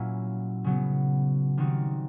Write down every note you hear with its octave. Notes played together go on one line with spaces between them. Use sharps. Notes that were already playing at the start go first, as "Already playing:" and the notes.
Already playing: A#2 F#3 A#3 C#4 E4
C#3 F#3 B3
D#3 G3 C4 D#4 F#4